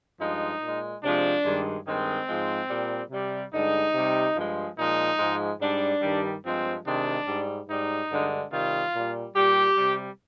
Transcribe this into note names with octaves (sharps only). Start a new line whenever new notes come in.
G2 F3 G#3 D#4
A#2 G#3
C3 F3 G#3 D4
G2 D#3 G#3
G2 D#3 G#3 C4
G#2 F3 G#3
A#2 G3
C3 G3
G2 D3 G#3 D#4
C3 G3
G2 F3 G#3
A#2 F3 G#3 D#4
G#2 F3 G#3
G#2 G3 D4
G2 D#3 G3
G2 F3 G#3 C4
C3 D#3 G#3 D4
G#2 G3
G#2 G3 D#4
G2 D3 G#3
C3 D#3 G3 F4
A#2 G3
A#2 G3 G4
C3 G3